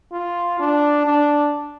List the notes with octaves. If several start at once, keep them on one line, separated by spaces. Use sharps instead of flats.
F4
D4
D4